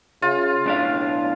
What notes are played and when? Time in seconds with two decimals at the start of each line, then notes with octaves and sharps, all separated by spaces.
0.22 C#3 F4
0.66 B1 A2 D4 F5